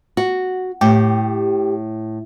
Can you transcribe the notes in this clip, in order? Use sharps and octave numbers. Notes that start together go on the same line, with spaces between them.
F#4
A2 G4